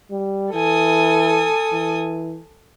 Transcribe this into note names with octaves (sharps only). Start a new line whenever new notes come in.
G3
E3 A4 G#5 D#6
E3